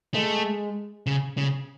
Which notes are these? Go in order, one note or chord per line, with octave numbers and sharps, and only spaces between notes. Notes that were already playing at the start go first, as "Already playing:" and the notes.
G#3 A3
C#3
C#3